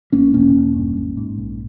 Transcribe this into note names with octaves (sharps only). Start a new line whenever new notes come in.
A#1 A#3 C#4
E1 A#3 C#4
E1
G2
G#1
G#2
A#1